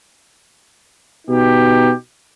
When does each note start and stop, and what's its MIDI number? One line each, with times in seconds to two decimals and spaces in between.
1.28 1.92 47
1.28 1.92 59
1.28 1.92 63
1.28 1.92 67